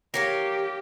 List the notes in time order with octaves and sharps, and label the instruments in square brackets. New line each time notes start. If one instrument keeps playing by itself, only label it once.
[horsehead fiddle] G4 [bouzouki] A#4 C#5 F5